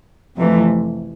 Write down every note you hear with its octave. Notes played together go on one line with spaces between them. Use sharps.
F2 C3 E3 A3